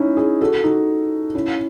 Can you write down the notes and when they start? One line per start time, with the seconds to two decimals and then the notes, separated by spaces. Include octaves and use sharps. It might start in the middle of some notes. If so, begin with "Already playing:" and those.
Already playing: C#4 D#4 E4
0.17 E4 G#4
0.41 F#4 A4
0.64 D#4 F#4
1.35 C#4 E4